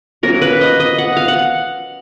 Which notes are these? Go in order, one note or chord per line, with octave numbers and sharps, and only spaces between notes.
F#3 A#3 C#4 A#4
B4
D#5
D#5
F#5
F5
F#5